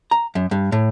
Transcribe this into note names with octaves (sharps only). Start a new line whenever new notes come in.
A#5
F#2
G2
A2